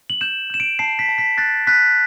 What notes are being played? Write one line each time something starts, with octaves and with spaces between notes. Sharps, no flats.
F#7
G6 E7
G6 E7
D7
A5 C7
B6
A5
B6
F#6 A6
F#6 B6